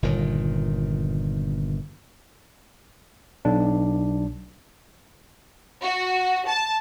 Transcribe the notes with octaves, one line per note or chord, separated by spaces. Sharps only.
G1 A#2 D#3
B1 D4
F#4
A5